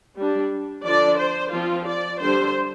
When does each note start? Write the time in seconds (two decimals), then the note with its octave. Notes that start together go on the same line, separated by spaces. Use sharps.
0.17 G3 D4
0.85 D3 F3 D4 D5
1.19 C5
1.52 F3 C4 F4
1.87 D5
2.20 D3 G3 D4 C5